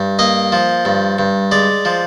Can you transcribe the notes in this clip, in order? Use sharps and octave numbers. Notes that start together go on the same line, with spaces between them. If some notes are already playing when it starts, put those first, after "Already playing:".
Already playing: G2
A#3 D#5
F3
G2
G2
G#3 D5
F3